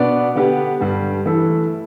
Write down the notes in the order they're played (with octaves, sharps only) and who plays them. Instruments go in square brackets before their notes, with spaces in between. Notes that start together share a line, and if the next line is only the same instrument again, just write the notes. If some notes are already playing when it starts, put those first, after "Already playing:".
Already playing: [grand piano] B2 B3 D4 B4 D5
D3 B3 D4 G4 B4
G2 D3 G3
E3 A3 E4 A4